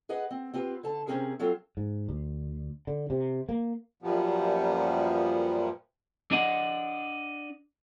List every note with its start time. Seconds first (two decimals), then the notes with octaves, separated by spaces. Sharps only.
0.09 G#4 B4 D#5 F#5
0.31 C4
0.54 C4 F4 G4 A#4 B4
0.83 D3 A4 A5
1.07 C3 G#3 C4 C#4 G#4 A#4
1.39 F#3 C4 F4 A4
1.77 G#2
2.09 D2
2.87 D3
3.10 C3
3.49 A#3
4.02 F#2 A#2 F3 G3 B3
6.31 D4 D#5 F#5